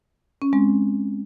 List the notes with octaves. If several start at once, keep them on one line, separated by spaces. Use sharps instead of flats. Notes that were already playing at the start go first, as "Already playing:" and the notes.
C#4
G#3 C4